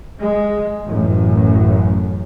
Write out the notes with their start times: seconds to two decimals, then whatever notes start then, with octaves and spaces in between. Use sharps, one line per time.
0.21 G#3
0.87 A1 F#2